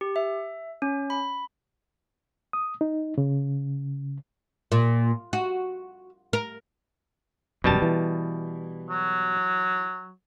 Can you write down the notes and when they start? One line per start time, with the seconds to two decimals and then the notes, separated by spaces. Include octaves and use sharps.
0.01 G4
0.16 E5
0.82 C#4
1.10 B5
2.53 D#6
2.81 D#4
3.18 C#3
4.72 A#2
5.33 F#4
6.33 A#4
7.64 E1 F#2 B2 G3 A5
7.82 E3
8.90 F#3